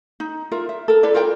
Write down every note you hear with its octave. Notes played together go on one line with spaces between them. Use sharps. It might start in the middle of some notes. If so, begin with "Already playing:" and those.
D#4
F4 A#4 E5
E5
A4 A#4
E4 A4 B4 D5
F4 A#4 D5 G5